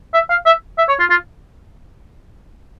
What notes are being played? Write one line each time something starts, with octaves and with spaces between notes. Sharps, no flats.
E5
F5
E5
E5
C#5
F4
F4